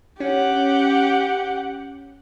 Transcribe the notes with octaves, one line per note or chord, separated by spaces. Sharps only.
C#4 G4 F#5